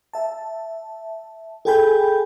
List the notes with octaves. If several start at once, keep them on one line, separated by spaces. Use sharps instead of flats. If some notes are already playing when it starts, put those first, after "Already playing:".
E5 A5
G#4 A4 G5 G#5 B5 G6